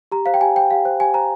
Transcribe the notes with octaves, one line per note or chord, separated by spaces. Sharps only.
G4 A#5
C5 F5
G5
G4 G#5
C5 G5
G4 F5
C5
G4 G#5
C5 A#5